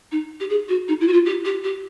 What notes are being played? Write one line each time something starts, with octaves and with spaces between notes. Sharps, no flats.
D#4
G4
G#4
F#4
D#4
E4
F#4
F4
G4
G4
G4